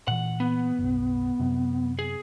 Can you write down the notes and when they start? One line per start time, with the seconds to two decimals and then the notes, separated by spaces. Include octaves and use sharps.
0.08 A#2 E3 F#5
0.40 B3
0.79 F#1 B1
1.40 F#2 C3
1.99 G#4